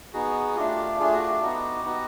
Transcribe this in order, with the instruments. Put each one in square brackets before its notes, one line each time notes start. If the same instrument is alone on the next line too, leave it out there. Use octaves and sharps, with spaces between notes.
[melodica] B3 D#4 F#4 G#4
A3 D4 F4 G4
A3 D4 F4 G#4
F#4
G4
B3 D#4 F#4
B3 D#4 F#4